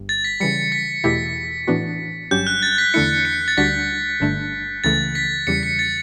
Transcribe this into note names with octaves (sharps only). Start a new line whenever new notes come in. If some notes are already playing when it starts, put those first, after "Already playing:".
Already playing: G1 G2
A6
B6
C#3 E3 G3 C#7
B6
E2 B2 A3 E4 G4 B6
A2 E3 B3 D4 F#4
G1 G2 F#3 C#4 G4 G6
F#6
A6
B6
E2 D3 A3 E4 C#7
C#7
A6
D2 D3 G3 D4 F#4 B6
G1 G2 D3 A3 D4
C#2 C#3 E3 A3 A6
B6
E2 C#3 E3 G3 C#7
B6
A6